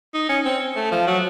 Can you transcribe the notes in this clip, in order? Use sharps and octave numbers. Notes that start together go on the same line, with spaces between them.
D#4
C#4
C4
A3
F3
F#3